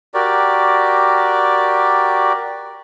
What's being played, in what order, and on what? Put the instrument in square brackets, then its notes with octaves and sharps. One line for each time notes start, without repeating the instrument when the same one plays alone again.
[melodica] F#4 G4 A#4 D5